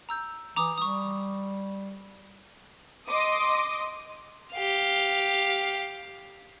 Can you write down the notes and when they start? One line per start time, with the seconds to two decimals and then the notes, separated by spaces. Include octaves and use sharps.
0.09 A#5 E6 G6
0.56 E3 A#5 D6 D#6
0.78 G3 C#6 D#6
3.08 D#5 C6 D6 D#6
4.54 G4 F5